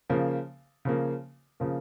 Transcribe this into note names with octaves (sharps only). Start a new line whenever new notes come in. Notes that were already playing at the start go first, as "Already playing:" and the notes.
C#3 F3 A#3
C#3 F3 A#3
C#3 F3 A#3